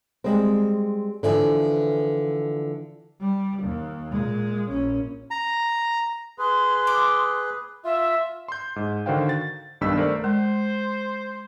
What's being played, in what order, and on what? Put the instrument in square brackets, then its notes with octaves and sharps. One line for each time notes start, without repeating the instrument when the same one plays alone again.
[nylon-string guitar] G3 G#3 C4
D3 E3 F3
[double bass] G3
D#2
A#2 G#3
A#1 C#4
[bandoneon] A#5
[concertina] G#4 B4 [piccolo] C6
[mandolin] D6
[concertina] F4 [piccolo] E5
[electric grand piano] C6 G6
G#2
D3 D#3 F#4 C5 F5 G5
A6
B1 G2 D#3 D4 E6 B6
A3 A#4 C5 D5
[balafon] G#3 [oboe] C5